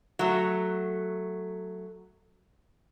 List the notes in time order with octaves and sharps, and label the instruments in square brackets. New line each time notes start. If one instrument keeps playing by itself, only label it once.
[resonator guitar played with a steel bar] F#3 A3